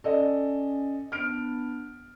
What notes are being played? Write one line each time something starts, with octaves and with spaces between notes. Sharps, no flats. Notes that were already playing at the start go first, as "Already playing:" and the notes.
C#4 A4 D5 D#5
B3 D4 F6 D7